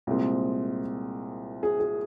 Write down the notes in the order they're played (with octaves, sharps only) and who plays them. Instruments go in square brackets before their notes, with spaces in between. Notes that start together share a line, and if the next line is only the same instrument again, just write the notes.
[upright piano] C2 A#2 G#3 C4
G#4
G#4